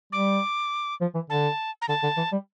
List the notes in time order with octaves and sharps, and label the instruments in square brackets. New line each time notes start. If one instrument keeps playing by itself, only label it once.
[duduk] G3 [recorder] D6
[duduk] F3
E3
[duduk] D3 [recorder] A5
[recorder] A#5
[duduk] D3 [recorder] A5
[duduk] D3
E3
G3